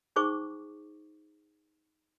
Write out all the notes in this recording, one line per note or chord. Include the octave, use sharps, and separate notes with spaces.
C#4 D#4 G#4 C5 C#6 D6